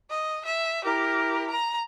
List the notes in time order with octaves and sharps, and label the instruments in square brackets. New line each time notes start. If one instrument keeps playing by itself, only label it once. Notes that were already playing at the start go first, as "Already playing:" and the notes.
[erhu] D#5
E5
[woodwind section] E4 A#4 [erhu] G4
[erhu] A#5